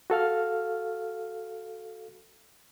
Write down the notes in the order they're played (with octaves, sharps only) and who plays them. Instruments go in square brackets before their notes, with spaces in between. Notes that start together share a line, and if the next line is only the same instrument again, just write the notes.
[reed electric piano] F#4 A4 F5 F6